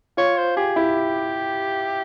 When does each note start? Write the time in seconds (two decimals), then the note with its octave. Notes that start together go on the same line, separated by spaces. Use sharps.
0.17 F4 C#5
0.37 C5
0.57 G4 G#4
0.76 E4 G4